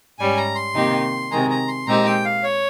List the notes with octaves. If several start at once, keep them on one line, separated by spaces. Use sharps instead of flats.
G#2 G3 C#4 G#5
A#5
C6
C3 D#3 A#3 D#4 G4
C3 D#3 G#3 A#5
A#5
C6
A#2 G#3 C4 D#4 G4 A#5
G5
F5
C#5